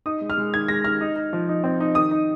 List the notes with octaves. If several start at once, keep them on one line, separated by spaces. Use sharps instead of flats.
D#4 D#6
G#3
F6
G#3
D#3 G#6
G#3 A#6
D#3 F6
D#4
D#4
F3
D#4
C4
D#4
D#3 D#6
D#4